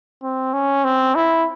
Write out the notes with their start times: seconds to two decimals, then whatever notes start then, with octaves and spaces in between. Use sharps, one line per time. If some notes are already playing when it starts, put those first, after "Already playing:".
0.23 C4
0.53 C#4
0.84 C4
1.15 E4